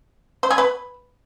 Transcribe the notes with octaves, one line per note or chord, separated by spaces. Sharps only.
C5
G#4
B4